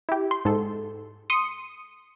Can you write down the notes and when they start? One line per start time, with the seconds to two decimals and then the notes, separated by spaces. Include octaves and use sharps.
0.09 E4 G4
0.31 C6
0.45 G#2 A4
1.30 C6 D#6 C#7 D#7